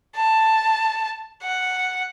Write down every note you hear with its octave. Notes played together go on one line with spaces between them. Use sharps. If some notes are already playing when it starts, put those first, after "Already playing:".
A5
F#5